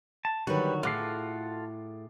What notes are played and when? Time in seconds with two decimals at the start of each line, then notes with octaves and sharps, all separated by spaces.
0.25 A5
0.47 D3 D#3 F#3 G3 F#4 B4
0.83 A2 F4 F#4 G#4 A4 D6 C7